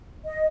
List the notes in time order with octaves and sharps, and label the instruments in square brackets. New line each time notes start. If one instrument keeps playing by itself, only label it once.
[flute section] D#5